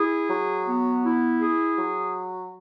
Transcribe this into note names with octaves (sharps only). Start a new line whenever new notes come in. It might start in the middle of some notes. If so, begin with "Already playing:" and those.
Already playing: E4 G#4
F#3
B3
E4
G#4
F#3